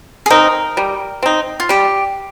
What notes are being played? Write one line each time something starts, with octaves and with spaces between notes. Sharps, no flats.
G#4
C4 D#4 A#4
G3
C4 D#4
F4
G3 G4